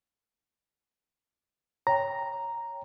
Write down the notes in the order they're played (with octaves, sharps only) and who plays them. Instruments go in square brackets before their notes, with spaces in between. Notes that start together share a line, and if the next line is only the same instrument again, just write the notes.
[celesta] C#5 G5 [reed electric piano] A#5